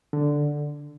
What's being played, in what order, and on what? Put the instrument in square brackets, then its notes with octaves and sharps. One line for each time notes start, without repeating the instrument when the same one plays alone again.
[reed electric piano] D3